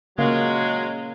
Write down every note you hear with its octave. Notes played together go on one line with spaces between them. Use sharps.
C#3 F#3 G#3 A#3 F5